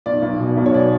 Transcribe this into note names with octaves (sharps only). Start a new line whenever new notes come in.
B1 D5
B1
B2
B1
C#5
B2 D5